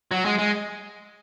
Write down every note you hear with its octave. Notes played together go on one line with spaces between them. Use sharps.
F#3
G#3
G#3